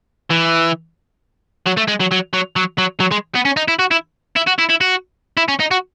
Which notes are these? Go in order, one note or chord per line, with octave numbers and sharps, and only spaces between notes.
E3
F#3
A3
G#3
F#3
F#3
F#3
F#3
F#3
F#3
G#3
B3
C#4
D#4
E4
F#4
E4
E4
F#4
E4
E4
F#4
E4
C#4
D#4
F#4